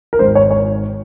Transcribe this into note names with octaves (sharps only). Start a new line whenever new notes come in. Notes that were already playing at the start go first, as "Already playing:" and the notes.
A#4
G#1 G#2 D#3 C5
C#5
C#5